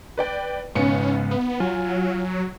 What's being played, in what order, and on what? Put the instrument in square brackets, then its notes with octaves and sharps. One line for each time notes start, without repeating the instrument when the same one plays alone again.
[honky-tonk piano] B4 D5 G5
[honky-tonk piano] B1 B3 C#7 [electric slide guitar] G#2 C#3 [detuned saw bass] C#4
[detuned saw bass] B3
[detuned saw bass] F#3 [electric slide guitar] F4 [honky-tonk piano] G#5